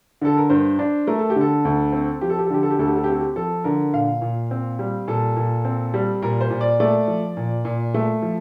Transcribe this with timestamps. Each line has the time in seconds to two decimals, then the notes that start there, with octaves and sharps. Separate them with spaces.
0.21 D3 A4
0.38 A#4
0.50 G2 C5
0.79 D4
1.07 A3 A#4
1.19 A4
1.30 G4
1.36 D3
1.41 A4
1.65 D2
1.93 C4
2.21 F3 G4
2.30 A4
2.39 G4
2.47 A4
2.50 D3 G4
2.63 A4
2.71 G4
2.79 D2 A4
2.87 G4
2.96 A4
3.04 G4
3.08 C4 A4
3.20 G4
3.36 F3 A4
3.64 D3 A#4
3.93 A#2 F5
4.22 A#2
4.51 C4
4.79 G3
5.08 A#2 A4
5.37 A#2
5.65 C4
5.94 G3
6.22 A#2 A#4
6.41 C5
6.50 A#2
6.61 D5
6.80 A3 D5
7.08 F3
7.37 A#2
7.65 A#2
7.94 A3
8.22 F3